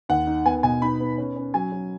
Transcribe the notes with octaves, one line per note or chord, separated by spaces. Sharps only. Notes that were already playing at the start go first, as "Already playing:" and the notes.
D#2 F#5
D#4
B3 G#5
B2 G#5
D#4 B5
B3
C#4
C#4
F#3 G#5
F#3